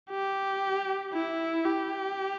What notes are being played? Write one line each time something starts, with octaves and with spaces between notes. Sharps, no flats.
G4
E4
G4